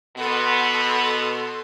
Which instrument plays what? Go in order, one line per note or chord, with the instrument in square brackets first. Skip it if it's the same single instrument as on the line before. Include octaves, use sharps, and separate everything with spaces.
[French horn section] B2 B3 [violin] A4 C6